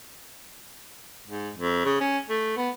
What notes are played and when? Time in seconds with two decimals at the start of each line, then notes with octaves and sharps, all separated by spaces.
1.26 G#2
1.56 F2
1.85 C#3
2.00 C#4
2.29 A3
2.57 B3